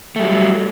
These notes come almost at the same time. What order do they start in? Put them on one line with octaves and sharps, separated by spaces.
A3 G3 F#3